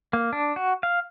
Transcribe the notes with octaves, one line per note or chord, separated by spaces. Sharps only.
A#3
D4
F#4
F5